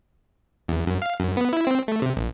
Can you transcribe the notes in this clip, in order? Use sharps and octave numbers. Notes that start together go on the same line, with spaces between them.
E2
F#2
F5
F#2
B3
E4
C4
A3
C3
A#1